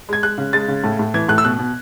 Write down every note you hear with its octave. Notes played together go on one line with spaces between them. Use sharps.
G#3 G#6
G#3 F#6
C#3
G#3 A6
C#3
A2
A2
E3 G#6
A2 F#6
E6
B2 F#6
B2